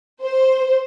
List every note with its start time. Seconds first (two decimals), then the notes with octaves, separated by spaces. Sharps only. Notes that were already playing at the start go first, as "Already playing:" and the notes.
0.22 C5